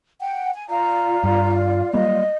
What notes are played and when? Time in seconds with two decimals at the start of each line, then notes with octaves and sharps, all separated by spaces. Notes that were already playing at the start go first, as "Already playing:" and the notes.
0.21 F#5 G5
0.54 G#5
0.69 F4 D5 F5 A#5
1.24 G2
1.93 F#3 G3 A#3 D#5